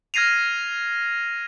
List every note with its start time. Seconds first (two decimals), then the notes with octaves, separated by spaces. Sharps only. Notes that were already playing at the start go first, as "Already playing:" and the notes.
0.14 F6 G#6 A#6 C7 D#7 F7